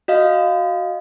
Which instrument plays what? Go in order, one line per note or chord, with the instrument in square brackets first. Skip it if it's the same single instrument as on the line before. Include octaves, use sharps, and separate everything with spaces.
[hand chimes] F#4 D#5 F5